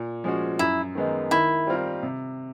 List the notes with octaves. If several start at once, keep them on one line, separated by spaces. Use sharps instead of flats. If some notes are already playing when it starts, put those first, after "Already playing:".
Already playing: A#2
F3 G#3 C#4 F#4
F#2 E4
D#3 G#3 B3 D#4
D#3 E4
G3 C4 F4 A#4
C3